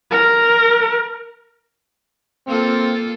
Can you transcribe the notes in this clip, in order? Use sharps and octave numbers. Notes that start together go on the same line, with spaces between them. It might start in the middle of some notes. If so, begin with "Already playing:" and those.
A#4
A#3 C4 F4 A4